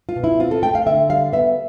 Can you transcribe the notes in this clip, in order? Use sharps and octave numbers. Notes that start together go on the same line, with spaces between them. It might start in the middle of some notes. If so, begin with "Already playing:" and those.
F4
B2
E4
C4 F4
A4
A3 G5
F5
D3 E5
G3 F5
B3 E5